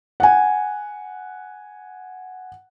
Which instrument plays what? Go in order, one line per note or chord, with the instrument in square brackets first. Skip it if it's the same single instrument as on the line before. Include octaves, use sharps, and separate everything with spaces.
[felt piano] F#5 G#5